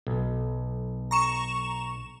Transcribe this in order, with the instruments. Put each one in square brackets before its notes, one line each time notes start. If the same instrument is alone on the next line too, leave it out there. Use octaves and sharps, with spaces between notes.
[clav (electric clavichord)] B1
[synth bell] A#5 C#6 E7